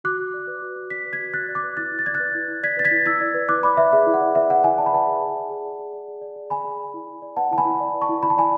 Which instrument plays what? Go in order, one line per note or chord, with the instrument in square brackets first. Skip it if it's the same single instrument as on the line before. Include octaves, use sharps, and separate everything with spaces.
[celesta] F#4 D6 F#6
F#4
D5
B4
F#4
F#4
D5 B6
B4
G#6 B6
F#4
F#4 F#6 A6
D5
D6 F#6
B4
E4 F#6 A6
E4
A6
D5 G#6
F#6 A6
B4
E4
E4
D5 G#6 B6
B4 A6
G#6 B6
E4
E4 E6 G#6
D5
B4
E4 D6 F#6
D5 B5 D6
B4 E5
G#4 E5
E4
F#5
D5
B4 E5
G#4 F#5
E4 E5 G#5
D5 A5
B5
B4 F#5 A5
G#4
G#4
D5
G#4
D5
G#4
D5
G#4
D5
G#4
D5 G#5 B5
G#4
D5
E4
E4
D5
B4 F#5 A5
E4 A5
G#5 B5
E4
D5
B4
A5 C#6
E4
E4 B5
A5
D5 G#5 B5